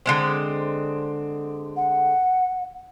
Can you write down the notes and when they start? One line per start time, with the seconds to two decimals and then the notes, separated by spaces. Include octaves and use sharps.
0.06 D3 G#3 C4
1.76 F#5